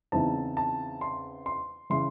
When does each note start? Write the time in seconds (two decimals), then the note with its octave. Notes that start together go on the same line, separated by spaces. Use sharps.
0.12 E2 C#3 E3 C4 D#4 A5
0.57 A5
1.01 C6
1.46 C6
1.90 C#3 E3 C6